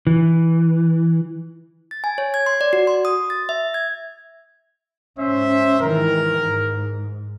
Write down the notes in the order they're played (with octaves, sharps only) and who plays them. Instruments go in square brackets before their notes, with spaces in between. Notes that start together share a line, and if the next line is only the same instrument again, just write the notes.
[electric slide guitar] E3
[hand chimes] A6
G#5
C#5
G#6
C6
D5
F#4
C6
D#6
A6
E5
G#6
[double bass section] G#2 C#4 [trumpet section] C5 E5
[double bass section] G#2 D#3 E3 [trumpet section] A#4
[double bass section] G#2